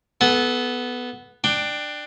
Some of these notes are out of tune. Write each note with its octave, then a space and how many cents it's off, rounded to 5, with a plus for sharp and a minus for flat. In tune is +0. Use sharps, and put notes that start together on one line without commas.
B3 +0 A4 -25
D4 +15 G5 +5